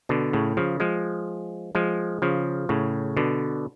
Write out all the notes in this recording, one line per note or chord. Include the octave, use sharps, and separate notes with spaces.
B2 D3
A2 C#3
C#3 F3
F3 G#3
F3 G#3
C#3 F3
A2 C#3
B2 D3